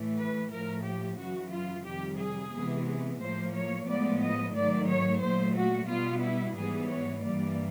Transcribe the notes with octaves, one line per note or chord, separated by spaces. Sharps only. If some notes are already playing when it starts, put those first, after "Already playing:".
Already playing: A2 E3 A3
B4
A2 F3 A3 A#4
G4
F#2 C#3 E3 F#4
F4
F2 C3 D#3 G3 G4
G#4
C3 E3 G#3 B3
A2 F3 A#3 C5
C#5
A2 F3 G#3 B3 D5
D#5
G#2 D#3 F#3 A3 D5
C#5
A#2 F#3 A3 C5
F#4
B2 G3 B3 F4
E4
G#2 E3 G3 B3 G#4
C#5
G2 E3 G3 A#3 D5